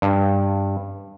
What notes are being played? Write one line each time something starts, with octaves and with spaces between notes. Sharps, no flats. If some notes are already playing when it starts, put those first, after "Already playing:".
G2